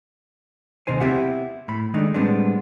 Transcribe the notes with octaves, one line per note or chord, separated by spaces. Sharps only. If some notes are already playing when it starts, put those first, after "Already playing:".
D#2 C3 D#4 C5 G#5
B3 C4 E4 G4 E5 F#5
A2 B5
D#3 G#3 A3 D4 D#4
A2 G3 G#3 B3 C4 D4